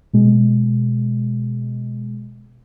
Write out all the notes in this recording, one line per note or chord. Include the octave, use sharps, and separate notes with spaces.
B2 G#3